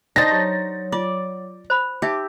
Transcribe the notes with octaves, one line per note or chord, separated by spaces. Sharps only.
D4 D#4 C5 D5 D#5 A5 A6 A#6
F#3 G4 C#5 C#6
F4 D5 D6
C5 B5
D#4 G4 E5 D6 E6